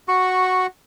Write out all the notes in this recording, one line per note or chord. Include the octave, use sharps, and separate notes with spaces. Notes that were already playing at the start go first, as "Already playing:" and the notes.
F#4 C#6